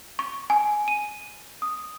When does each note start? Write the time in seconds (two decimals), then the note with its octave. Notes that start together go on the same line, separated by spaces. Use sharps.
0.19 C#6
0.50 G#5
0.88 D#7
1.62 D#6